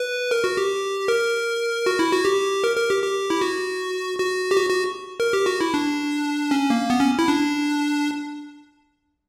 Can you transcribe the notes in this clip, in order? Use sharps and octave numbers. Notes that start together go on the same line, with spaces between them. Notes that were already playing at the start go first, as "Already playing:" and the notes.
Already playing: B4
A#4
F#4
G4
A#4
F#4
E4
F#4
G4
A#4
A#4
G4
G4
E4
F#4
F#4
G4
F#4
F#4
A#4
G4
F#4
E4
D4
C#4
A#3
B3
C#4
E4
D4